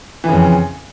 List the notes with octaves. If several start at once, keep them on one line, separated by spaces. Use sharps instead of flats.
F2 C#3 E3